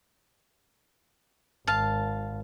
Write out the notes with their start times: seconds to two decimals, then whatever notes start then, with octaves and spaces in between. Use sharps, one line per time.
1.67 G#1 F5 A5